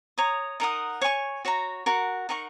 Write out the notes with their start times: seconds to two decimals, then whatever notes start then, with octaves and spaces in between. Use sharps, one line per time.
0.18 C#5 A#5 D#6
0.60 D#4 A#4 F#5 D#6
1.01 C#5 G#5 C#6
1.45 F#4 C#5 A#5
1.86 F#4 A#4 F#5
2.29 D#4 A#4 F#5 C#6